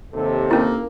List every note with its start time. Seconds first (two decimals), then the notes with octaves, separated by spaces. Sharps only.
0.14 D#2 C3 A4
0.51 A#3 C#4 E4